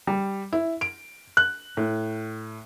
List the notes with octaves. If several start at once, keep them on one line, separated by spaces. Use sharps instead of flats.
G3
E4
D7
F#6
A2